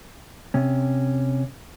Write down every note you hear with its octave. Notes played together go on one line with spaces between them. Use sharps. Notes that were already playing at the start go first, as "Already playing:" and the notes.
C3 C#4